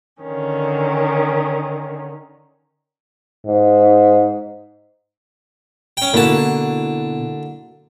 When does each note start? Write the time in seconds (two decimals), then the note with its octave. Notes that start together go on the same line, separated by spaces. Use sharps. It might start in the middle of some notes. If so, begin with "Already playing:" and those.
0.24 D3 D#3 C#4
3.46 G#2
5.97 C#4 G5
6.13 B2 D3 A#3 E4 F#4 A5